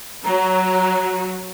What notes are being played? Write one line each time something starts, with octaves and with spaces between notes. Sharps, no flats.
F#3 A#5